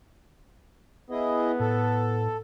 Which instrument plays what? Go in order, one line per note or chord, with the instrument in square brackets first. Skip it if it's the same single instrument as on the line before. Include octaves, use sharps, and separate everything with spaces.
[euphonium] B3 [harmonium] E4 G#4 D#5
[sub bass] A2 [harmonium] A4